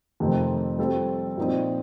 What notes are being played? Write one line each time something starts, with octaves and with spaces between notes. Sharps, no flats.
F2 C3 D#3 A3 C4
G3 C4 F4 A4
A#2 F3 C4 D#4